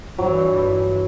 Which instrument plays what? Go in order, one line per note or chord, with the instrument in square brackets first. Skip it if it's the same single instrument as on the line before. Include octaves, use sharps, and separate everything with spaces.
[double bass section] G2 E3 [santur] F#3